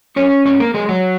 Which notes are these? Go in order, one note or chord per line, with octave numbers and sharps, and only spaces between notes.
F#3 C#4 C#5
G#2 C#4 C#5
A#3 A#4
F#3 G#3 G#4
F#3 F#4